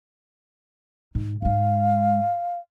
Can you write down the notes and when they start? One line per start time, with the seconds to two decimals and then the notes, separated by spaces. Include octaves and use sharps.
1.15 G#2
1.42 G#2 G#3 F5